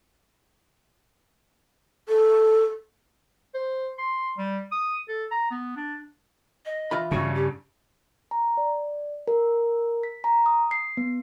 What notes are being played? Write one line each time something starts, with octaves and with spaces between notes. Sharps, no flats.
A4
C5
C6
G3
D#6
A4
A#5
B3
D4
D#5
E3 F4 B5
G2 C#3 F#4
G4
A#5
D5
A#4
B6
A#5
D#6
C7
B3